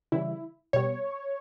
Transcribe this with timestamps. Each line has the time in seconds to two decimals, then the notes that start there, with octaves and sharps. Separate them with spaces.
0.12 C#3 E3 G3 E4
0.73 B2 G3 C#5